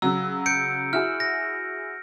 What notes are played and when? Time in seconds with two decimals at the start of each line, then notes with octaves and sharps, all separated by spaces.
0.02 C#3 F#3 E6
0.46 G6 C#7 D7
0.93 E4 F#4 G#4 F6
1.20 A#6